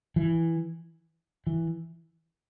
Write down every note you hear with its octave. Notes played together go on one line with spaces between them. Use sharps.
E3
E3